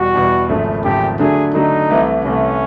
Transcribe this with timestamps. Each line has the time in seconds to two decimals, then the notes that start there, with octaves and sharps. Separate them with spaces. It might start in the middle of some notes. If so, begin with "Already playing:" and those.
Already playing: E2 B2 G3 F#4
0.14 E2 B2 G3
0.49 G#1 F#2 C#3 F3 A3
0.84 G#1 F#2 C#3 F3 A3 G4
1.19 D3 F#3 A3 D4 G#4
1.54 D3 F#3 A3 D4 D#4
1.90 C2 C3 E3 A3
2.25 C2 C3 E3 A3 C#4